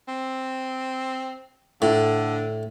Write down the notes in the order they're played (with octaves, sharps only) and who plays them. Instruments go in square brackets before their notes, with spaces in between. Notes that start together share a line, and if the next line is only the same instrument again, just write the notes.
[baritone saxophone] C4
[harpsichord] A2 [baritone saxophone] D3